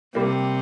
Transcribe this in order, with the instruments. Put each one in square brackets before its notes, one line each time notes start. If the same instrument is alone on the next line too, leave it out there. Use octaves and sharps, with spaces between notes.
[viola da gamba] C3 [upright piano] G3 A#3